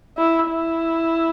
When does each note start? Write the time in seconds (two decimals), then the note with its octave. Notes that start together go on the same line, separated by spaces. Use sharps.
0.17 E4
0.49 E4